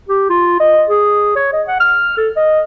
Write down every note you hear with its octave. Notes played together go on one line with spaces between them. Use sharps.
G4
F4
D#5
G#4
C#5
D#5
F#5
F6
A4
D#5